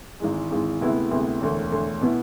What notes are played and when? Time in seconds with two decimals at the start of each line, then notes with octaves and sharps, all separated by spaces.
0.20 G#1 G#2 E3 G#3
0.50 G#1 G#2 E3 G#3
0.81 D2 C3 G#3 B3 E4
1.10 D2 C3 G#3 B3 E4
1.41 E1 D2 D3
1.71 E1 D2 D3
2.01 B2 B3 E4